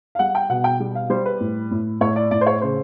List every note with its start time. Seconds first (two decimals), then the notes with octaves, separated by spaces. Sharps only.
0.15 F5
0.19 G3 F#5
0.35 G5
0.49 B2 F#5
0.64 G5
0.80 G3
0.95 F5
1.10 G3 C5
1.26 B4
1.40 A2
1.71 A2
2.01 A2 C#5
2.16 D5
2.31 A2 D5
2.41 C5
2.47 C#5
2.62 C#3 C5